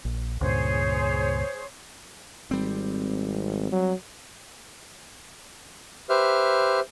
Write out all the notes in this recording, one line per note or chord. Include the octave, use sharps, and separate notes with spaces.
A#1
C#2 G2 A#2 G#4 C5 C#5
G#1 G3 C4
F#3
G4 B4 C5 E5 F6